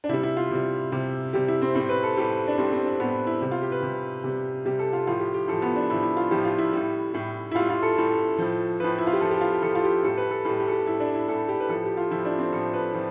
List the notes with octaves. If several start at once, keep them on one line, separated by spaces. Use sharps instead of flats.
D4
C3 G3 E4
E4
F4
C3 G3
C3 G3
C3 G3 G4
E4
C4
A2 G3 C4
B4
A4
A2 G3 G4
D4
A2 G3 C4
C4
D4
A2 G3 B3
E4
C3 G3
F4
G4
B4
C3 G3
C3 G3
C3 G3 G4
A4
F4
A2 F3 F4
G4
G4
A2 F3 A4
B3
D4
A2 F3 E4
E4
F4
A2 F3 G4
F4
E4
A2 G3
A2 G3
E4
A2 G3 F4
F4
A4
A2 G3
A2 F3
A2 F3 B4
E4
F4
G4
A2 F3 A4
G4
F4
G4
A2 F3 A4
F4
G4
A2 G3 A4
B4
A4
A2 A4
G3
G4
A4
G4
A2 G3 E4
D4
E4
A2 G3 A4
G4
B4
A2 F3 A4
G4
F4
A2 F3 E4
D4
C4
A2 F3 A4
B4
A2 F3